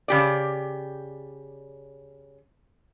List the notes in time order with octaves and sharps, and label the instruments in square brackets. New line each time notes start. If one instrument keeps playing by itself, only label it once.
[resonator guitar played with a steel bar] C#3 G4 D5